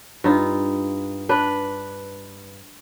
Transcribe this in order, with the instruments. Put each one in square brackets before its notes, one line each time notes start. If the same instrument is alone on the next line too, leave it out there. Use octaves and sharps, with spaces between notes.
[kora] G2 D#4 F4
D4 B4